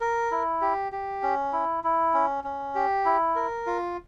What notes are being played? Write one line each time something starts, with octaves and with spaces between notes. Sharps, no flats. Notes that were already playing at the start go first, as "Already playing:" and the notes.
A#4
E4
G4
G4
C#4
E4
E4
C#4
C#4
G4
E4
A#4
F4